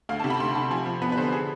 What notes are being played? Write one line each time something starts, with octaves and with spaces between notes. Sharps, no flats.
D2 F5
A5
C3
B5
D2 C6
C3 A5
F3 G#5
F3
B3 B4
B4
D3 C5
G#4